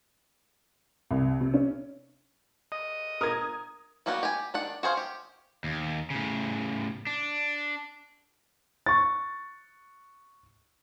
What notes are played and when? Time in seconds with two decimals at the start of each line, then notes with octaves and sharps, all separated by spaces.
1.11 C2
1.41 C3
1.54 C#4
2.72 D#5
3.21 A#4 D#6 G#6
4.06 F#3 G3 A#3 B3 F#4
4.23 G4 G#5
4.54 D#3 D4 F#5
4.83 F#4 G#4 C5 F5
4.97 G4
5.64 D#2
6.10 A2 C#3
7.07 D4
8.86 C#6 A6